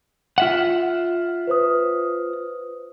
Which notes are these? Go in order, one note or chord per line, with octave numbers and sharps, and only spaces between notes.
F4 E5 F#5
B4 C5 D#6